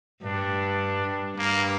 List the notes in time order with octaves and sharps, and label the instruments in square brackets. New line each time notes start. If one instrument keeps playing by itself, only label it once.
[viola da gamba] G2 [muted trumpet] D4
[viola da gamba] G2 [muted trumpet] A#3